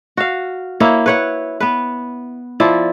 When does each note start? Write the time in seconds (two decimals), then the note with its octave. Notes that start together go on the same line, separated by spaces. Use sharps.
0.17 F#4 F5
0.80 A#3 E4 C#5
1.06 B4 C#5 F#5
1.60 B3 B4
2.60 F3 E4 D5